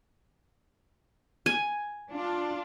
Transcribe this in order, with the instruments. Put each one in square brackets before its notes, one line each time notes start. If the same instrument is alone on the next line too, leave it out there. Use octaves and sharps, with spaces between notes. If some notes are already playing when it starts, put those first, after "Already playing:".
[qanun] G#5
[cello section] D4 F4